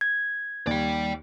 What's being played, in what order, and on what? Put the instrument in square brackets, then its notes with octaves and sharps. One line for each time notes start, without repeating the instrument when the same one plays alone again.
[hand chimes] G#6
[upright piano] D#2 [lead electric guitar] D5 G5